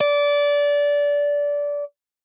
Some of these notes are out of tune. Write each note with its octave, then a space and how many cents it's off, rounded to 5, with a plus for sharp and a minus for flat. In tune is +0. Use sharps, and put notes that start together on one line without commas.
D5 -20